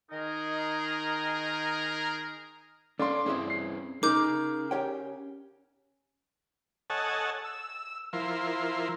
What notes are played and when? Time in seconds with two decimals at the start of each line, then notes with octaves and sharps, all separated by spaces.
0.10 D#3 D#4 G#4 A#4 D#5
2.99 C#4 D4 A4 D5 F5 C6
3.26 C4 C#4 E4 G#4 B4 E5
3.50 C7
4.03 C#4 D#4 G#4 A#4 D6 G6
4.71 G4 C#5 G5
6.90 A4 C#5 D#5 F#5 G#5 A5
7.44 E6
8.13 F3 E4 A#4 C6